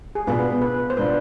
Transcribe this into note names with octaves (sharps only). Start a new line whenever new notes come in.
G#4
B2 B3 D4 F4 B4
B4
C5
B2 B3 D4 F4 B4